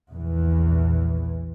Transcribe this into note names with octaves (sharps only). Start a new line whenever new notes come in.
A#1 E2 E3